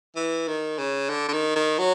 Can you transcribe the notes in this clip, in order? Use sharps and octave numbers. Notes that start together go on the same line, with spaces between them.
E3
D#3
C#3
D3
D3
D#3
D#3
F#3